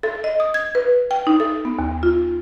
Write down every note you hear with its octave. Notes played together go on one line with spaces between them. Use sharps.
A4
D#5
D#6
G#6
B4
G5
D#4
A4
B3
D#2
F4